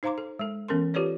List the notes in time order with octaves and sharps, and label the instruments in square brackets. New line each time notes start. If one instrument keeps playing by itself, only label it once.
[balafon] D#4 C5 F5 A#5 C6 D6
A4
G#3 A4
E3 B3 C#4 A4 A#4 C6
F4 G4 A4 B4 C#5 D5